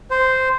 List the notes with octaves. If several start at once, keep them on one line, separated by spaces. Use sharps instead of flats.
C5